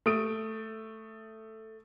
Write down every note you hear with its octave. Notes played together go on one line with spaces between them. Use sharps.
A3 D#6 D7